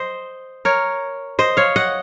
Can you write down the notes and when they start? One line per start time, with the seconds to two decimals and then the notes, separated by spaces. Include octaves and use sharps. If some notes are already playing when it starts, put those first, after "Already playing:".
Already playing: C5 D#5
0.65 A#4 C#5
1.39 C5 D#5
1.57 C#5 F5
1.76 D#5 F#5